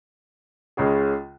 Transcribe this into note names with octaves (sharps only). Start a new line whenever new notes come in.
C#2 C#3 G#3 C#4 G#4